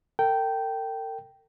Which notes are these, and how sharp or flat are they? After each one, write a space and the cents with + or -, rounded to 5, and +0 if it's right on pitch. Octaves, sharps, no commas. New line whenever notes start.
A#4 -45 G5 -10